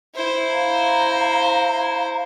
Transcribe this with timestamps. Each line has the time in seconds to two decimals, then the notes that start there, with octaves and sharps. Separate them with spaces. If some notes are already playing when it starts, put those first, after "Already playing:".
0.15 E4 C5
0.50 F5 A#5